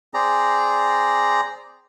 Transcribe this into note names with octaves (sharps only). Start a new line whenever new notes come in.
C4 G#4 D5 A#5